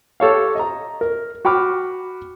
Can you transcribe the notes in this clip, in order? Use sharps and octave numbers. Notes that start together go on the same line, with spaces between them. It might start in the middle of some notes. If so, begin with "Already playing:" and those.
G4 A4 C#5 F5
D#5 A#5
A#4
F#4 G5 B5 D6 F6